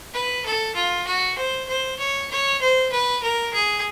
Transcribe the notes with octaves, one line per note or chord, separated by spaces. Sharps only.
B4
A4
F4
F#4
C5
C5
C#5
C#5
C5
B4
A#4
G#4